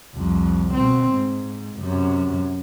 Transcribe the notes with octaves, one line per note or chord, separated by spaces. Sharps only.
C2 F2
B2 C4
G#2
F#2 C3